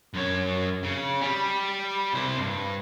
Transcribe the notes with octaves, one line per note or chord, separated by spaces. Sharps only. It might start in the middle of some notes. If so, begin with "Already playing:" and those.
F#2 C#5
C#3
G3
C2 C5
G2